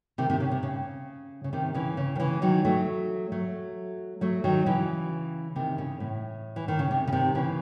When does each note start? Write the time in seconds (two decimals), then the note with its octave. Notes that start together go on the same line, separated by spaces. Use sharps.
0.18 C3 D#3
0.30 C3 D#3
0.40 C#3
0.51 C3
0.63 C#3
1.44 C#3
1.53 C3 D#3
1.75 C#3 E3
1.97 C#3
2.16 D#3
2.20 C#3 E3
2.42 D#3 F#3
2.65 F#3 A3
3.32 F#3 A3
4.21 F#3 A3
4.44 D#3 F#3
4.66 C#3 E3
5.56 C3 D#3
5.78 C#3
6.00 A2
6.56 E3
6.68 D#3
6.79 C#3
6.91 C3
7.07 C#3
7.13 C3 D#3
7.35 C#3 E3